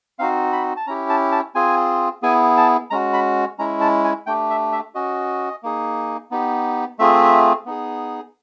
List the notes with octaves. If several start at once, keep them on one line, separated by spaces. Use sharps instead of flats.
C4 D#4 F#4 F5
B5
A5
C#4 E4 G4 A#5
A5
A5
C4 F4 G#4 G#5
B3 E4 G#4 G#5
A5
G#3 C#4 F#4 A#5
B5
G#3 C#4 E4 A#5
A5
G#5
A3 D4 G4 G5
E5
E5
C#4 F#4 D#5
A#3 D#4 G#4
B3 D#4 G4
A3 C4 F4 G#4 E5
B3 D#4 G#4